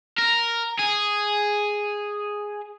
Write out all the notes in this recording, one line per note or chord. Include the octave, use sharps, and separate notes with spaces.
A#4
G#4